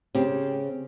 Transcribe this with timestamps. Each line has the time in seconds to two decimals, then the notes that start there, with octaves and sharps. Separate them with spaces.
0.15 C#3 C4 G4